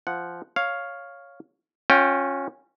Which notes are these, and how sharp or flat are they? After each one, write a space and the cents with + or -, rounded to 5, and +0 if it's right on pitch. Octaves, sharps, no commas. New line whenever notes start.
F3 -10 F#5 +0
C#5 +0 F5 +0
C#4 -10 F4 +40 G5 +0